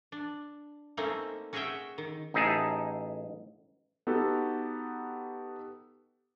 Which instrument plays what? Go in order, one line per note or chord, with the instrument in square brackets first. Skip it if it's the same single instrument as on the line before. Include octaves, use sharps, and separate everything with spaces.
[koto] D4
A3 A#3 C4 C#4 D#4
C#4 F#4 G#4 C#5 E5 G5
D#3
[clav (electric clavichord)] A1 D#4 E4 G#4 G#5 A5
[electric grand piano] B3 D#4 F#4 G4 A4